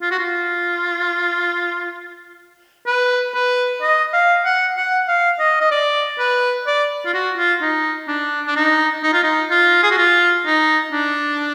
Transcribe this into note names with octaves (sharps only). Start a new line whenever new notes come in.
F4
F#4
F4
B4
B4
D#5
F5
F#5
F#5
F5
D#5
D#5
D5
B4
D5
F4
F#4
F4
D#4
D4
D4
D#4
D#4
F4
D#4
F4
G#4
F#4
F4
D#4
D4